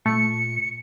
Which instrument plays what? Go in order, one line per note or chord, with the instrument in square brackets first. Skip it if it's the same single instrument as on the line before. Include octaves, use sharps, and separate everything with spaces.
[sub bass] A#2 [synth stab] A3 [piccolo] C#7